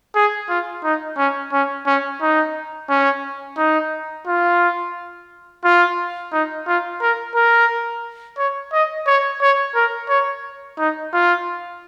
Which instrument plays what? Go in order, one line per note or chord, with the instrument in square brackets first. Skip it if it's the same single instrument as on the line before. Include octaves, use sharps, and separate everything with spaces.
[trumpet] G#4
F4
D#4
C#4
C#4
C#4
D#4
C#4
D#4
F4
F4
D#4
F4
A#4
A#4
C#5
D#5
C#5
C#5
A#4
C#5
D#4
F4